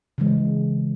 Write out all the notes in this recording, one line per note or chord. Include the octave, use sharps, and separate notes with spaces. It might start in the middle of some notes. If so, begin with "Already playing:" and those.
C#3 E3 G#3